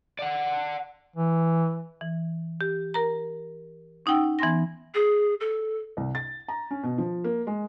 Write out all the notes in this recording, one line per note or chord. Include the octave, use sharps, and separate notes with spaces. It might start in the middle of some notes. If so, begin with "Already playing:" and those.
D5 F#5
E3
E3
G4
A#4 A#5
C#4 D#4 F#5 G5 E6
E3 B3 G#5 C6 A#6
G#4
A4
C2
A6
A#5
C#4
B2
F3
A#3
G#3